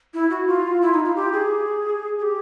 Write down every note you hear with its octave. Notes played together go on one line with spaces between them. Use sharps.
E4
F#4
F4
E4
D#4
F4
G4
G#4
G#4
G4